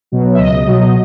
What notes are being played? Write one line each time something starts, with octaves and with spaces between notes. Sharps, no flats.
B2 F#3
E5
C#2 D#5
B2 F#3